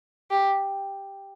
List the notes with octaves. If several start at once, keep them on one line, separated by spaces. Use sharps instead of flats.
G4